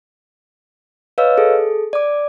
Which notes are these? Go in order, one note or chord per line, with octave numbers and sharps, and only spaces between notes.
B4 C#5 D#5 F5 E6
G#4 A4
D5 D6